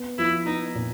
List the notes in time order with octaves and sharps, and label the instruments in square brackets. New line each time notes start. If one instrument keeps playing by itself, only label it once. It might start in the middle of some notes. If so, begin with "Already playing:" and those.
Already playing: [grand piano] B3
[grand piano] F3 [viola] E4
[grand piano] B3 [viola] D#4
[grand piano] A#2